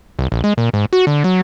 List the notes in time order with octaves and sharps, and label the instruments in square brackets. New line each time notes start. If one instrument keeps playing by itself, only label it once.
[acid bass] C2
A#1
G#3
A#2
G#2
F#4
D3
F#3